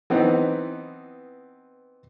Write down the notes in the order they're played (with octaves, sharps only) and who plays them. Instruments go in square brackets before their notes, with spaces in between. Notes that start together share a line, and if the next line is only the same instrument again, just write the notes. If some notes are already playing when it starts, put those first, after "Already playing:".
[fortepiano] E3 B3 C4 D#4